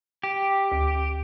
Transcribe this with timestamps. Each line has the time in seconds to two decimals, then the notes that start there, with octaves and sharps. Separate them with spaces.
0.23 G4
0.72 D2